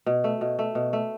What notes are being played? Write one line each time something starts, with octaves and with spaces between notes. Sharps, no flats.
B2
A3
B2
A3
B2
A3